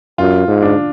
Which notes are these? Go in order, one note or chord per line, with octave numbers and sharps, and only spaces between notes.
F#2 F4
G#2
D4